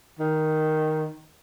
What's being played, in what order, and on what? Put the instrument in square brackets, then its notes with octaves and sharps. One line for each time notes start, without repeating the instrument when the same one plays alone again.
[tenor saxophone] D#3